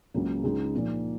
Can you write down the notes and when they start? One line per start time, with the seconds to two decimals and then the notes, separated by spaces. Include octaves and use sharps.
0.14 C#2 C#3 F#3 A#3
0.43 C#2 C#3 G#3 D#4 G#4
0.74 A#2 F3 A#3 D#4